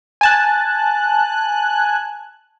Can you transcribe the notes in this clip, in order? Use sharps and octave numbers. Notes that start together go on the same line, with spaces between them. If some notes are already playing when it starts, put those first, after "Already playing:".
G#5 A5 F#6